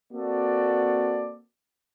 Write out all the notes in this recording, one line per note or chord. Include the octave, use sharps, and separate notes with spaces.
A#3 C4 F#4 A4 D5